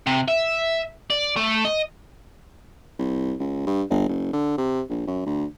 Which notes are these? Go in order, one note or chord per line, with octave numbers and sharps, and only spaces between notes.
C3
E5
D5
A3
D#5
C2
C#2
G2
G1
F#1
D3
C3
A#1
F#2
D2